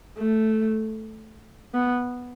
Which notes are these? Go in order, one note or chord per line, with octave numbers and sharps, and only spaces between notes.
A3
B3